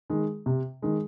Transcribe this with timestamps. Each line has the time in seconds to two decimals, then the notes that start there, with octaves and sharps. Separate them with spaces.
0.10 D#3 G#3
0.46 C3
0.82 D#3 G#3